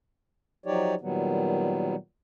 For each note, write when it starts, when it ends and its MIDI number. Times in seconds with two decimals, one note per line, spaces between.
0.66 0.95 53
0.66 0.95 54
0.66 0.95 63
0.66 0.95 67
0.66 0.95 73
0.66 0.95 74
1.01 1.95 46
1.01 1.95 51
1.01 1.95 54
1.01 1.95 55
1.01 1.95 59